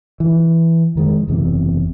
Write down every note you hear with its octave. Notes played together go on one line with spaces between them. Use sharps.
E3
F2 D#3 G#3
F#1 E2 C3